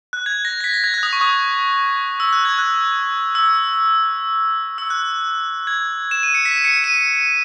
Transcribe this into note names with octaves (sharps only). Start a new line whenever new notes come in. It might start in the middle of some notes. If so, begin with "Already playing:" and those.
F#6
G#6
A#6
A#6
B6
A#6
G#6
F#6
D#6
C#6
D#6
E6
F#6
G#6
F#6
E6
E6
F#6
G#6
E7
D#7
C#7
B6
C#7
D#7